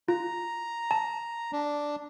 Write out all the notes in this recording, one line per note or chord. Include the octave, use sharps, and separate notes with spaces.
F4 A#5
A5
D4